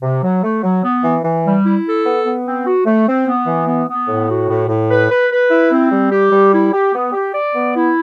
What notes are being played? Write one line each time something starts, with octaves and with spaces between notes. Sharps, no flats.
C3
F#3
A3
F#3
B3
E3
E3
G3
E4
A4
B3
B3
C4
F#4
A3
C4
B3
E3
B3
B3
A2
F#4
A2
A2
B4
B4
B4
E4
C4
G3
G4
G3
E4
G4
B3
G4
D5
B3
E4